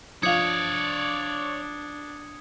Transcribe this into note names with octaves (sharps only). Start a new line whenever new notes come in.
F3 D4 C#5 D5 F5 D#6 G#6 C#7